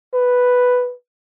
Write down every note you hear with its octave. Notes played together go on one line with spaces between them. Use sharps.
B4